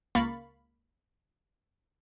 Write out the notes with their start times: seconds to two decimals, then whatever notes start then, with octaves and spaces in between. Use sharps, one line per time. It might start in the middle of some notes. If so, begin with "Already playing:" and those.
0.15 C#2 A#3 F5 B5 C#6 A6